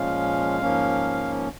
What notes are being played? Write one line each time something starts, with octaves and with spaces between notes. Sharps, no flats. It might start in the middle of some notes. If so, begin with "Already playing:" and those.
Already playing: A#2 F3 G#3 C#4 F5
G#2 F3 A#3 C#4